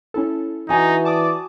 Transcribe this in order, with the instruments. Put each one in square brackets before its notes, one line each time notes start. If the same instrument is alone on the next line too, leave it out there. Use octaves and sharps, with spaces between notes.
[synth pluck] C#4 E4 A4
[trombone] E3 [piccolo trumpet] D#4 [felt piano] F#4 G#5
[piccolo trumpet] D5 [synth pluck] A5 D6 D#6